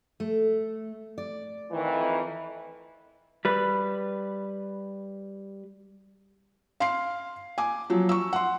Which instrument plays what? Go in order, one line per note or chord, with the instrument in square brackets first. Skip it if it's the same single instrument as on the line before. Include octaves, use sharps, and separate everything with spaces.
[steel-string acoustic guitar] A3
D5
[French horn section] F2 D#3 E3
[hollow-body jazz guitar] G3 B4
[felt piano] F5 C6 C7
G#5 D6
F3 F#3
C#6 E6
F#5 C6